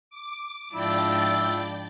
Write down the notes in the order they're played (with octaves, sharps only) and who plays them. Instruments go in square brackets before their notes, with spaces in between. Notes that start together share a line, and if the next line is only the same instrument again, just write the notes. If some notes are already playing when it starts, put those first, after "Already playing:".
[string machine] D6
[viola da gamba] G#2 F3 D4 [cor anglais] E4 [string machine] D5 G5 A6